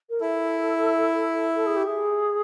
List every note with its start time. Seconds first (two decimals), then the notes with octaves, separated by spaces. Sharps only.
0.10 A#4
0.20 E4 A4
1.55 A4
1.66 G#4
1.76 G4
1.87 G#4